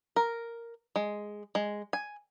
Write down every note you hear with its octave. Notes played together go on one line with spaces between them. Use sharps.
A#4
G#3
G#3
G#5